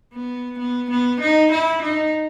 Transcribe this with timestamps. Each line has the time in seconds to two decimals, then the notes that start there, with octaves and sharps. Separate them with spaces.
0.13 B3
0.58 B3
0.90 B3
1.20 D#4
1.52 E4
1.82 D#4